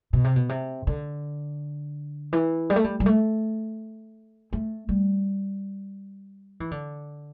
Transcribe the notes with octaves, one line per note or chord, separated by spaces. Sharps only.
B2
C3
B2
C3
D3
E3
G3
A3
G3
G3
A3
A3
G3
E3
D3